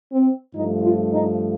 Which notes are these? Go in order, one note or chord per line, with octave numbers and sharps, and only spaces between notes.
C4
G2 F3 A3 D#4
F4
D#4